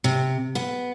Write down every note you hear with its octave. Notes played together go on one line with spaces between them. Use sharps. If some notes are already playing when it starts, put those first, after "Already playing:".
C3
B3